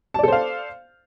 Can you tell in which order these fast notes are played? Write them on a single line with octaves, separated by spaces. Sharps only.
A5 D5 A4 C5 F5